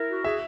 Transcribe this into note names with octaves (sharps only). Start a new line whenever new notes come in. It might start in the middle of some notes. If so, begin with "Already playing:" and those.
Already playing: E4 A#4 E5
F#4
G#4 E5